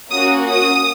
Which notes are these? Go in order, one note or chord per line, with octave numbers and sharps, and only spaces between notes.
A#3 C#4 F#4 D#6
D#6